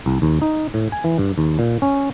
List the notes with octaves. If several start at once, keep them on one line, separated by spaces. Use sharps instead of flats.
C2
D#2
D#4
A2
G#5
E3
G2
D#2
A#2
C#4